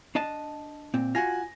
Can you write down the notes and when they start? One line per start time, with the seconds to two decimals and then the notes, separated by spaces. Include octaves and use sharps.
0.15 D4 D#5 A5
0.94 A#2 C4
1.15 F4 F#4 G#5 A#6